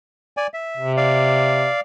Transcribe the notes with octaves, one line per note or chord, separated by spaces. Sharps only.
D5 G#5
E5
C3
D5 F5